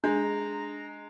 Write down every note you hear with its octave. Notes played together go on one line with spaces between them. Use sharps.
G#3 D4 A#5